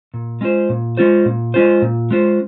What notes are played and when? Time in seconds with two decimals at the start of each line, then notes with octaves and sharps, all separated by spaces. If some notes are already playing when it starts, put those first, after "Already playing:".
0.14 A#2
0.41 G#3 C#4 F4 C5
0.69 A#2
0.97 G#3 C#4 F4 C5
1.25 A#2
1.54 G#3 C#4 F4 C5
1.82 A#2
2.11 G#3 C#4 F4 C5